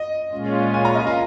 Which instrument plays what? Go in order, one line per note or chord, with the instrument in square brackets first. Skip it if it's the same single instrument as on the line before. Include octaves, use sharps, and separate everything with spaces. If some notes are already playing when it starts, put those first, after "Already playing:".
Already playing: [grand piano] D#5
[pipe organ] A#2 G#3 C#4 F4
[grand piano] G#5
A#5
D#5
F4